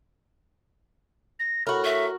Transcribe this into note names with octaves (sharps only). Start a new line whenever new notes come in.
A#6
A2 F#4 A#4 B5
E5 C#6